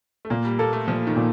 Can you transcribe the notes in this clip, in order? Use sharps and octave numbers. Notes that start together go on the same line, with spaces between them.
A3
A#2 A#3
G3
A#3 A4
A3
A#2 F3
D#3
A#2